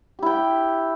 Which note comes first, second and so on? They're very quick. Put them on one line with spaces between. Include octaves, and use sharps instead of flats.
G4 E4 G5